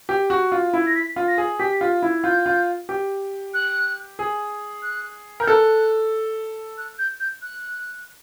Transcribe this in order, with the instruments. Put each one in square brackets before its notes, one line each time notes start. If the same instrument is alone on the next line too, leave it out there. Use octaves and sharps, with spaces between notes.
[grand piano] G4
F#4
F4
E4
[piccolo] A#6
B6
[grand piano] F4
[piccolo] A#6
[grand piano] G#4
[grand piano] G4 [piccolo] B6
[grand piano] F4
E4
[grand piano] F4 [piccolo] G6
[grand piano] F4
G4
[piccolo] F#6
[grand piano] G#4
[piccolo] F#6
[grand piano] A#4 [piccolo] G6
[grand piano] A4 [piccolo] F#6
[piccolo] F#6
G6
G6
F#6